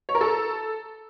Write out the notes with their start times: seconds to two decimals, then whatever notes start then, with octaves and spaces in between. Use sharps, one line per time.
0.09 C#5
0.15 A#4
0.21 A4